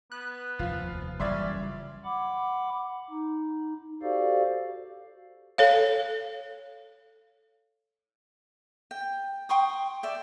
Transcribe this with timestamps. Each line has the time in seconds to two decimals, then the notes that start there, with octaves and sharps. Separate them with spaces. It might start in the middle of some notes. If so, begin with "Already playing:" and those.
0.12 B3 F#6
0.59 F1 D#2 F3 F4
1.20 F#1 A2 E3 G3 C#4 D5 E5 C6
2.05 F#5 B5 D6
3.10 D#4
4.02 F#4 G4 A4 C5 D5 F5
5.58 A4 C#5 F5
8.91 G5
9.49 G5 C6 C#6 D#6
10.03 D5 E5 G5